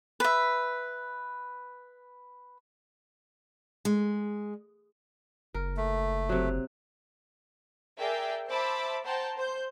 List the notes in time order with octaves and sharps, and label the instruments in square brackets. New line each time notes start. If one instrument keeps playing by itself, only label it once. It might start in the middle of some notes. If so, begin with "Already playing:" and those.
[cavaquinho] B4 E5
[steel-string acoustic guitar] G#3
[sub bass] F#1 [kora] A#4
[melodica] A3
[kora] C3 F#3
[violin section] G#4 A#4 D5 E5 G5
C5 E5 A5 B5 D6 E6
C5 F#5 G5 A5 A#5 C6
C5 G6